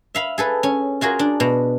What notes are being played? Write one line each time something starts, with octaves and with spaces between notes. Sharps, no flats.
E5 F5 B5
G#4 A4 B4
C#4
F4 F#4 G#4 A#4
D4
B2